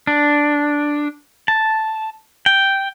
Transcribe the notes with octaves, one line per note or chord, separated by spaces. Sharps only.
D4
A5
G5